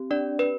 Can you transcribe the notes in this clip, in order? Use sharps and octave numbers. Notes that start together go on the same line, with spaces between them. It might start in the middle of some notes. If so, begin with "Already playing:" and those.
Already playing: C4 G4
D4 D5
B4